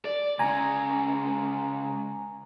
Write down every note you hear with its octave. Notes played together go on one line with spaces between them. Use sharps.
D5
C#2 C#4 G#5 A#5